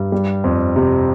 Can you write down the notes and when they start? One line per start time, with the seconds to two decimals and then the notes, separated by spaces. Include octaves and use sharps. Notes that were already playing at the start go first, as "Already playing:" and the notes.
Already playing: G2
0.12 G3
0.44 F2
0.76 C3